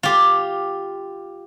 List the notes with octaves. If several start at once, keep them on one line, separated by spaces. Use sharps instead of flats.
F4 G4